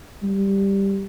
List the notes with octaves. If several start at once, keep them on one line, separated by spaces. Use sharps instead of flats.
G3